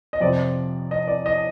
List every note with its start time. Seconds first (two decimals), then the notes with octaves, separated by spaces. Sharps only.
0.13 D#5
0.20 F2 C3 F3 D5
0.91 D#5
1.08 D5
1.26 D#5